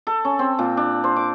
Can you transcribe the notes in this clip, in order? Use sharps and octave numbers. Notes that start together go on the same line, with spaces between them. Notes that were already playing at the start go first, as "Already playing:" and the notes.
A4
C#4
C4
A#2
D4
C5
D6